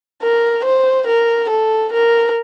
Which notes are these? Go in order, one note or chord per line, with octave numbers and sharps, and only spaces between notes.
A#4
C5
A#4
A4
A#4